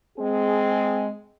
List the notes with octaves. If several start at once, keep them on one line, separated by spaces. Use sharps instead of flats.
G#3 C4 G#4